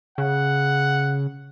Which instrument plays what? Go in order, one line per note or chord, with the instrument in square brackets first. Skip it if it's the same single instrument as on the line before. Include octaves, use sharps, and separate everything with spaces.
[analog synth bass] C#3 [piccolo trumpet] F#5